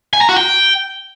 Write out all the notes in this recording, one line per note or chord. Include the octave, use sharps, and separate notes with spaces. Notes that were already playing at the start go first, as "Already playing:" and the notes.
G#5
A#5
F#4
G5